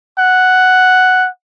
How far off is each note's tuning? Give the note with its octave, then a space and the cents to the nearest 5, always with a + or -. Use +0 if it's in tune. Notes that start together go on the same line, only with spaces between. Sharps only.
F#5 +5